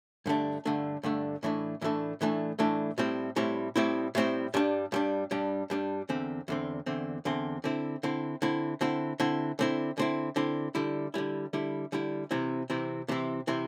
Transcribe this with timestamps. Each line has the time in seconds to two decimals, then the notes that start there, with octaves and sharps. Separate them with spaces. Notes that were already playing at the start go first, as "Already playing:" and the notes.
0.26 G2 D3 A3 D4
0.65 G2 D3 A3 D4
1.03 G2 D3 A3 D4
1.43 A2 E3 A3 D4
1.81 A2 E3 A3 D4
2.21 A2 E3 A3 D4
2.59 A2 E3 A3 D4
2.98 A2 G3 C4 E4
3.36 A2 G3 C4 E4
3.76 A2 G3 C4 E4
4.15 A2 G3 C4 E4
4.54 G2 G3 D4
4.92 G2 G3 D4
5.31 G2 G3 D4
5.70 G2 G3 D4
6.09 E2 D3 C4
6.48 E2 D3 C4
6.86 E2 D3 C4
7.25 E2 D3 C4
7.64 D3 C4 E4
8.03 D3 C4 E4
8.42 D3 C4 E4
8.81 D3 C4 E4
9.20 D3 C4 E4
9.59 D3 C4 E4
9.98 D3 C4 E4
10.36 D3 C4 E4
10.75 D3 G3 E4
11.14 D3 G3 E4
11.53 D3 G3 E4
11.92 D3 G3 E4
12.31 C3 E3 C4 E4
12.70 C3 E3 C4 E4
13.08 C3 E3 C4 E4
13.47 C3 E3 C4 E4